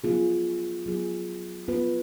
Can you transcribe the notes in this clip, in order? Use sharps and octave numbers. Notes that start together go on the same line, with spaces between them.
F#3 B3 F4 G#4
F#3 B3 F4 G#4
B3 F4 B4